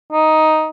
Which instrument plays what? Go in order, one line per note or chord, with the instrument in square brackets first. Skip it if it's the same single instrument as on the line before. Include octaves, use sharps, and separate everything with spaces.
[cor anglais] D#4